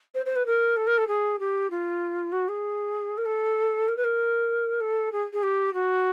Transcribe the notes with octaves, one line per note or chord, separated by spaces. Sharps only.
C5
C5
B4
A#4
A4
A#4
A4
G#4
G4
F4
F#4
G#4
A#4
A4
A#4
B4
A#4
A4
G#4
G#4
G4
F#4